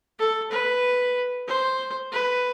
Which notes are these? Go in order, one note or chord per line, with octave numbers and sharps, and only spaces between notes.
A4
B4
C5
B4